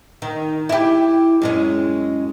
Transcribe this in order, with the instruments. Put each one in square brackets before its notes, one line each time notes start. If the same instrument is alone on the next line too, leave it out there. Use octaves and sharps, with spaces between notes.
[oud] D#3
E4 G4
F#2 G#3 C#4